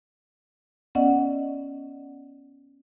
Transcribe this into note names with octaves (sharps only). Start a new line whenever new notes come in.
B3 C#4 D5 D#5 F#5